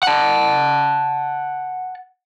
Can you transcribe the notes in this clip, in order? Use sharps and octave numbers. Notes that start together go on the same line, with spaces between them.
F#5 A5